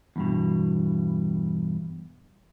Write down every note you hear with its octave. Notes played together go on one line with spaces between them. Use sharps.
E2 G2 B2